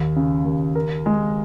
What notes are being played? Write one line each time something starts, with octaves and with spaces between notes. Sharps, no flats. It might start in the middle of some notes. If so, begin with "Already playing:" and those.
Already playing: D#2
C#3
D#2
A#4
G#3